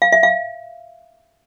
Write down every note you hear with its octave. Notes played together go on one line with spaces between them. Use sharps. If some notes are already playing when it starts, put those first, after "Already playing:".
F5
E5
F5